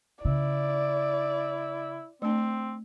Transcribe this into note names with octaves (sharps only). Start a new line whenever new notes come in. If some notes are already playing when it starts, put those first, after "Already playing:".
C#3 E4 D5
A3 C4 D4